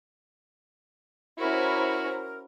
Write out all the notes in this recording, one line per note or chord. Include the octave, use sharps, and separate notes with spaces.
C#4 E4 F#4 A#4 C5 A#5